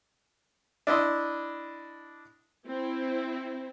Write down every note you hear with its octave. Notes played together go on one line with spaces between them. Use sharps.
D4 E4 D#5 C6
C4 E4